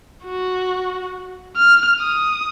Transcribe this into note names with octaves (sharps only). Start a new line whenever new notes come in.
F#4
F6
D#6